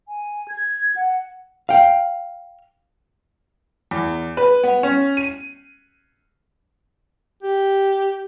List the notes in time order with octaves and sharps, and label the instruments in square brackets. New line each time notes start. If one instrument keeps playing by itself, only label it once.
[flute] G#5
G#6
F#5
[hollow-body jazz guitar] F5 G5
[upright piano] E2
B4
B3
C#4
D#7
[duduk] G4